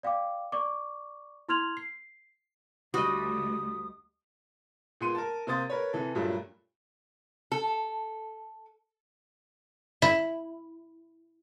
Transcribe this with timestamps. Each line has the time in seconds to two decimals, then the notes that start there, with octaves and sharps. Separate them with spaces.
0.03 D5 F5 G5 D6
0.52 D5 C#6 D6
1.49 E4 C6 F6 G#6 F7 F#7
1.77 C7
2.94 D2 G3 A3 F#4 D#5 D#6
5.01 A#2 G#3 B3 C6 C#7 D#7
5.15 A#4 A5
5.47 C3 A#3 C5 D#6 A6
5.70 A#4 B4 C#5
5.93 C3 E3 A4
6.15 G2 A#2 F#3 G3 A3
7.52 A4
10.02 E4